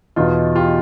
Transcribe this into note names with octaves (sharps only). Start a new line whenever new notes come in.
E2 B2 D#4 F4
F4 G4